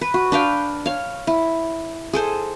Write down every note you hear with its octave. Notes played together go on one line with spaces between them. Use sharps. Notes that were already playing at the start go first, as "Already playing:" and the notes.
B4
F#4
D4 B4 F5 G5
C#5 F5
E4
G#4 A4 C5